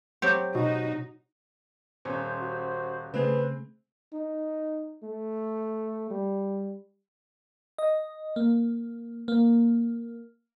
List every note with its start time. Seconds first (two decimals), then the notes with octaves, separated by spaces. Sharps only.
0.22 F#3 C4 G4
0.55 B2 D#4 F#4
2.05 D#1 C#4 C5
2.41 F#4
3.14 C#3 A3 C4 G#4 B4
4.13 D#4
5.03 A3
6.10 G3
7.78 D#5
8.36 A#3
9.28 A#3